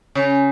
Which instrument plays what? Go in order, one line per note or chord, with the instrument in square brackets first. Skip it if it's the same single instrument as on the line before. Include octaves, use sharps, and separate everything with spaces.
[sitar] C#3